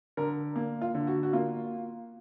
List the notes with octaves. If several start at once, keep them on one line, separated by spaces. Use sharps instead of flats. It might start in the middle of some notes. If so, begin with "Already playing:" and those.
D3 A#4
A#3
F4
D3
F#4
F#4
A#3 F4